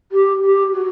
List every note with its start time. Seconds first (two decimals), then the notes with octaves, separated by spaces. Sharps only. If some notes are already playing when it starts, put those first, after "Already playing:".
0.12 G4
0.42 G4
0.73 F#4